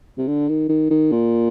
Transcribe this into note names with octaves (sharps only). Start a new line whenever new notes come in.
C3
D3
D#3
D#3
D#3
A#2